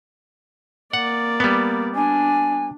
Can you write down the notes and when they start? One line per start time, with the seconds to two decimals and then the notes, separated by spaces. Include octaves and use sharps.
0.93 A#3 D5 F#5
1.40 G3 B3
1.95 D4 G#5